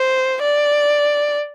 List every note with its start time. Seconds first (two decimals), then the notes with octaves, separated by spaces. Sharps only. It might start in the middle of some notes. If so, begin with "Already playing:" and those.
Already playing: C5
0.42 D5